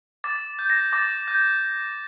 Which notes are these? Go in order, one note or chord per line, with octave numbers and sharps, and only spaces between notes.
D6 A6
G6
A#6
D6 A6
G6